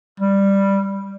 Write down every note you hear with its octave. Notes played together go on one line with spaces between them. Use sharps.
G3